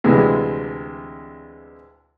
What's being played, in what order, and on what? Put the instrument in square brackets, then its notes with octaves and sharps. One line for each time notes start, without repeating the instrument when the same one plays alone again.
[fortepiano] D2 C3 E3 G#3